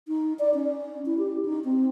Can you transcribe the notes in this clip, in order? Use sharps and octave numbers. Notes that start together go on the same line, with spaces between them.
D#4
D5
C#4
E4
G4
D#4
C4